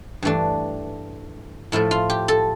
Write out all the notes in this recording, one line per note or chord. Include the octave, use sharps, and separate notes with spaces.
G2 E3 A3 D4
A2 F3 A3 E4
F4
G4
A4